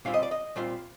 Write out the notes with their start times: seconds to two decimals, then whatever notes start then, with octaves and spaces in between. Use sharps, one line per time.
0.05 A#2 G3 C4 F4 F5
0.14 D#5
0.23 D5
0.31 D#5
0.56 A#2 G3 C4 F4